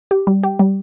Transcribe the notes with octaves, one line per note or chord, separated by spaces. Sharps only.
G4
G3
G4
G3